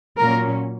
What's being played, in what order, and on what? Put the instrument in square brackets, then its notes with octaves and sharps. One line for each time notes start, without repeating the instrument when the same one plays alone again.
[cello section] A#2 F#3 A#3 C#4 A#4